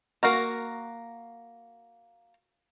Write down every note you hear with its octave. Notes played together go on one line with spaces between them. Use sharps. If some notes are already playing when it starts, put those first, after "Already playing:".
A#3 F#4 A#4